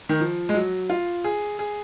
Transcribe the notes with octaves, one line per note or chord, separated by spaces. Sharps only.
D#3
F3
G#3
F#3
F4
G#4
G#4